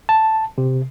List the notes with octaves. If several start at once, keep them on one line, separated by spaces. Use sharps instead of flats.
A5
C3